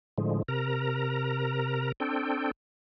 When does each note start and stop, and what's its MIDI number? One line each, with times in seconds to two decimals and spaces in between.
0.18 0.42 45
0.18 0.42 50
0.18 0.42 53
0.18 0.42 56
0.48 1.92 48
0.48 1.92 70
0.48 1.92 82
2.00 2.51 60
2.00 2.51 62
2.00 2.51 69
2.00 2.51 79